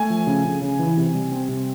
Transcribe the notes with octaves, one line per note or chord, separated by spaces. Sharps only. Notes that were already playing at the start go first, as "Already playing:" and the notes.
Already playing: A3 G#5
F3
C#3
C#3
C#3
E3
C3
G3
C4
C3